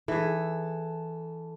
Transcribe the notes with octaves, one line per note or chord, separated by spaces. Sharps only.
E3 G#4 A4